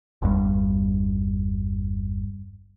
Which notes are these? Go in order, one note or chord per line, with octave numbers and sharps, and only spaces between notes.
G1 E2 G2 G3